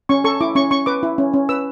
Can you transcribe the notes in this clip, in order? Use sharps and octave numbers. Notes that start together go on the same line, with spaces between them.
C#4 C#6
A4 C#6
E4 D6
C#4 C#6
C#4 C#6
B4 D6
E4
C#4
C#4
B4 E6